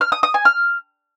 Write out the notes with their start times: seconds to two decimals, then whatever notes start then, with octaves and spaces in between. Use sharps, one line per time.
0.01 F6
0.12 D#6
0.23 D#6
0.34 G#5
0.45 F6